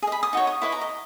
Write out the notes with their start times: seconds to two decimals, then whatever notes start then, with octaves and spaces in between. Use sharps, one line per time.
0.02 G#4 D#5
0.12 B5
0.23 D#6
0.33 D#4 F#4 C#5
0.47 D#6
0.62 E4 B4 D#5 C#6
0.72 A#5
0.81 D#5